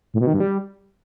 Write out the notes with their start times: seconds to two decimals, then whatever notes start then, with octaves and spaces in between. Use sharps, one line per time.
0.14 A2
0.20 B2
0.27 D#3
0.34 G2
0.40 G3